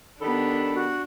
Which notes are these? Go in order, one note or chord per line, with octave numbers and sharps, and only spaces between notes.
D#3 B3 D4 G4 A4 B5
F#4